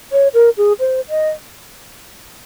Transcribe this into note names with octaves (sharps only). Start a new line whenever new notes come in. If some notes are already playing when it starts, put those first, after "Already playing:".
C#5
A#4
G#4
C5
D#5